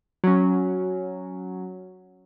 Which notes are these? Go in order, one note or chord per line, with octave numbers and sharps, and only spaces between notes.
F#3 C#4